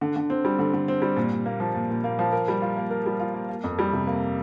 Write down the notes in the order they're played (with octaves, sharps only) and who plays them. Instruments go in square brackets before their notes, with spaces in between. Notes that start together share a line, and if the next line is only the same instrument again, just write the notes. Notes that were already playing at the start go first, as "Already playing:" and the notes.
[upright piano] D3
D3
C4
G3
D3
D3
C4
G3
A#2
A#2
A#3
F3
A#2
A#2
A#3
F3
A#4
G3
F4
A#3
A#4
G3
F4
A#3
A#3
F2
G3
C3
A#3